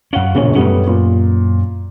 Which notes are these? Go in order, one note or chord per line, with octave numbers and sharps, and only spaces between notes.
F#2 C#4 F5 F#5
E1 A#1 C#3 B3 C#4 C#5
F#2 G3 A3 B3 C#4
A#2